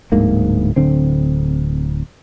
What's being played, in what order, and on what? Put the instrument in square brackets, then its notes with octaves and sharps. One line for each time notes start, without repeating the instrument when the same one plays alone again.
[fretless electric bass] D1 D2 G#2 A#3
D1 D3 C4